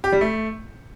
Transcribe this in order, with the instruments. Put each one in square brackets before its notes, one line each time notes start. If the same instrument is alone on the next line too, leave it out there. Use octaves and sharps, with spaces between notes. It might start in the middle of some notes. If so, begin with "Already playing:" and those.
[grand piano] G4
G3
A3